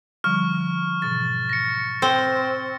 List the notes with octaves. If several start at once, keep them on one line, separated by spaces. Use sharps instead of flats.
D3 F3 G3 C#6 F6
G#2 B2 E3 A6
A#6 C#7
C4